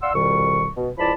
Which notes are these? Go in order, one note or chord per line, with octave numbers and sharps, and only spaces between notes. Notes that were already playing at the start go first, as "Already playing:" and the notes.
D5 F5 F#5 C6 E6
C2 F2 B2 D#3 G3 C#6
B2
C#2 F3 E4 D5 A5 B5